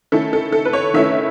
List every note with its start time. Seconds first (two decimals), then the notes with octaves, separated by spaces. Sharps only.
0.12 D#3 A3 C#4 E4 A4
0.33 A4
0.52 A4
0.65 B4
0.73 C#5
0.94 D#3 A3 C#4 E4 E5